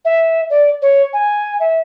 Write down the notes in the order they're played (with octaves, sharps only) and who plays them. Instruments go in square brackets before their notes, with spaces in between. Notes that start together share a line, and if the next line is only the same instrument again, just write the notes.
[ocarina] E5
D5
C#5
G#5
E5